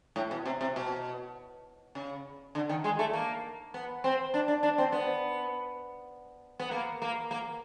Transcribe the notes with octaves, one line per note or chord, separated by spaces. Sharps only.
A2
B2
C3
C3
B2
C#3
D3
D#3
G#3
A3
A#3
B3
C4
D4
D4
D4
C4
B3
B3
A#3
A#3
A#3